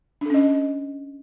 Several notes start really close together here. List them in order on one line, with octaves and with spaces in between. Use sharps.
D4 A4 C#4 D#5